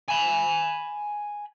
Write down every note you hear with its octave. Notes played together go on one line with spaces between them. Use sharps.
G#5 B5